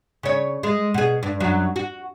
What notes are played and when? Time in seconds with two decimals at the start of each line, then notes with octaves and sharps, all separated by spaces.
0.23 C#3 C#5
0.63 G#3
0.94 B2 G#4
1.23 G2
1.40 F#2 F#3
1.76 F#4